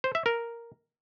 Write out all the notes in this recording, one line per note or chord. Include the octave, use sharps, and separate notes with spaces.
C5
E5
A#4